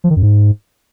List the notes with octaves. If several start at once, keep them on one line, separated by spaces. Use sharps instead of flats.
F3
D#3
F#2
G#2